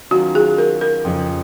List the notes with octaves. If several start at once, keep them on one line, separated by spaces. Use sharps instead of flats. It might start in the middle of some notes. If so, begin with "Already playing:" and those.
D#3 F#3 C#4 F4 F#4
G#4
A#4
A#4
F2 C#3 F3